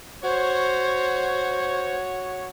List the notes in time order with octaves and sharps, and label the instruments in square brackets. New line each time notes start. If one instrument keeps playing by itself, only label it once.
[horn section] F#4 C#5 [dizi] C5